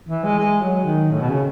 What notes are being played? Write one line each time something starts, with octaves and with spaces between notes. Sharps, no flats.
E3
G#3
G#3
F#3
D#3
A2
B2
C#3